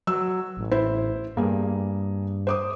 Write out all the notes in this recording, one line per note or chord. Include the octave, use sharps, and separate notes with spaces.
F#3 E6
A1
E4 C5
G2 A#3 G#4
C5 D6 D#6